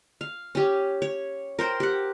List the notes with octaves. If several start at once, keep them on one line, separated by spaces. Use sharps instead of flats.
F5
C#4 G4
C#5
A#4 C5 G5
G4 F#5